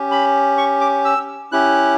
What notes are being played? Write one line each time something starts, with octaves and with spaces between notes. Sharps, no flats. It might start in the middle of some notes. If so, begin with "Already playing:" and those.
Already playing: C#4 G4
B5
C#6
D6
E6
C#4 E4 G4 F#6